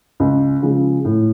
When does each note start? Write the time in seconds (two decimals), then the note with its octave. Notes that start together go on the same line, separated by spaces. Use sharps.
0.20 C#2
0.62 C#3 F3 G#3
1.05 A2